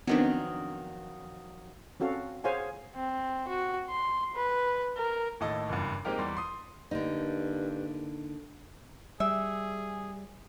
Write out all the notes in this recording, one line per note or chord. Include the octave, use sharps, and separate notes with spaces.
F2 D#3 F#3 B3 C4 D4
C4 C#4 F#4 A4 F5
G#4 C5 C#5 F5 F#5 G#5
C4
F#4
C6
B4
A#4
D#2 A2 A4 D#5
F#1 E2 G2
G#3 A#3 C4 D#4 G4 A#4
E2 G3 C6
C6 D#6
G2 D3 A#3 D#4
G3 G#4 E5